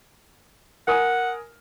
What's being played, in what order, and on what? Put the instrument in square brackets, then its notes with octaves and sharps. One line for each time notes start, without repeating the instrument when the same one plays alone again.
[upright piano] A#4 G#5 D#6 [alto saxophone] F#5